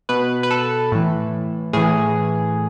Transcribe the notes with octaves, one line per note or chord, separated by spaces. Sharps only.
B2 B4
B4
A4
A2 E3
A2 E3 G#4